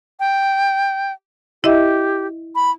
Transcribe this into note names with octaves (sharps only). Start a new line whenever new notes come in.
G5
E4 G4 D#5 E5
B5